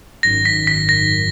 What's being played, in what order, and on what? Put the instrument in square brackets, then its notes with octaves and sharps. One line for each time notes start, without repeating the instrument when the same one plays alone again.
[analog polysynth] G#1 F#2 D#3 F#3 [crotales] A#6
[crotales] B6
B6
A#6